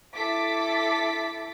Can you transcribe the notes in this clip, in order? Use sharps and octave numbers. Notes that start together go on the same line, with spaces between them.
E4 A4 D6 A6 B6